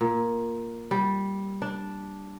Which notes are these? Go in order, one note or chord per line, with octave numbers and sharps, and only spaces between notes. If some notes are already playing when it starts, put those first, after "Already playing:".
A#2
G3
D4